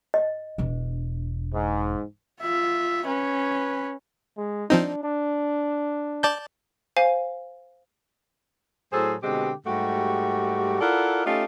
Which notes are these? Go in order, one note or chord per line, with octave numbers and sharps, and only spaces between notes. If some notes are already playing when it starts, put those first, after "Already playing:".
D#5
E1 D4
G#2
F4 E5
C#4 B4
G#3
F3 C4 D4 D#4
D4
D5 A5 G6
C5 F5 G#5
A2 F#3 G#4 A4 C5
B2 D3 G#3 C4 G4
G#2 G3 A3 F#4 G4
E4 F4 A4 A#4 D5 F#5
A3 C#4 D#4 F4 G4 A4